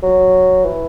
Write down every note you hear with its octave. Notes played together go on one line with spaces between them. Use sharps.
F#3
E3